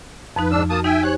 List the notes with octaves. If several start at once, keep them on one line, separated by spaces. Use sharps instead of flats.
F2 F3 D#4 B4
G#2 D4 E6 F6
A#3 F#4 A5 D#6
D#4 E5 G5 G#5
G4 C5 C#5 G#5 F#6